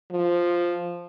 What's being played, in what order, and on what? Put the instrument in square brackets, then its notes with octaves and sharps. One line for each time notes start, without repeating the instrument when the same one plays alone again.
[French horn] F3